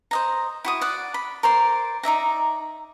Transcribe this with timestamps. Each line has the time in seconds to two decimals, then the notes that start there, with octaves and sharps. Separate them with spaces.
0.11 C5 D#5 A#5
0.65 E4 F#4 D#6
0.81 D5 F#5
1.14 B5
1.43 A#4 C5 D5 C6
2.03 D#4 D5 E5 A#5